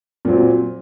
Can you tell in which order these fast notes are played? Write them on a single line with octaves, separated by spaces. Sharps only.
A#2 F#3 C4